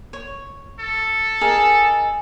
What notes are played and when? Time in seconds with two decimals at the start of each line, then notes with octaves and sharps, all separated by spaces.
0.13 C#5
0.80 A4
1.41 D#4 G#4 A#4